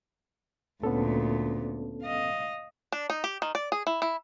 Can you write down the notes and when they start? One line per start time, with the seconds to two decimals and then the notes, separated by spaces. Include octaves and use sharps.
0.84 D2 A#2 B3 C#4 A4
2.03 D#5 F5
2.92 D4
3.10 D#4
3.24 G4
3.42 D#3
3.55 D5
3.72 G#4
3.87 E4
4.02 E4